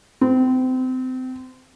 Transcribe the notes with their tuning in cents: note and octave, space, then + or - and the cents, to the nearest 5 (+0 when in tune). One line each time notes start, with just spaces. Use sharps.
C4 -30